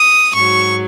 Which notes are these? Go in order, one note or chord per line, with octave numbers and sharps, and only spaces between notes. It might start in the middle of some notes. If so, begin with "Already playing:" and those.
Already playing: D#6
G#2 F#3 C#6